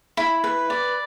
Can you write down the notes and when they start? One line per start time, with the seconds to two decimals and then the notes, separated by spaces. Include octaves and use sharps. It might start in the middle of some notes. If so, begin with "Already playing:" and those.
0.17 E4 B5
0.44 B4
0.70 D5